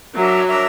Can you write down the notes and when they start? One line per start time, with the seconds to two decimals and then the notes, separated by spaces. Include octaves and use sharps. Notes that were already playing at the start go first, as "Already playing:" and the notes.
0.15 F#3 D4 A#4 E5 A#5
0.47 D4 A#4 E5 A#5